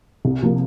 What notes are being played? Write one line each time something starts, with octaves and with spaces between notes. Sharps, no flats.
C2
C3 F3 A#3